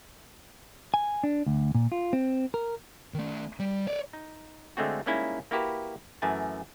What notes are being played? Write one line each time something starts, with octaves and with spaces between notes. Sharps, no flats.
G#5
D4
D2
A#2
F4
C4
A#4
D#3 A3
G3
C#5 D5
D#4
D3 G#3 A3 C4 F#4
G3 G#3 A#3 C#4 D#4 E4
A#3 E4 F#4 G4 A#4 B4
F#2 E3 A3 G#5 A5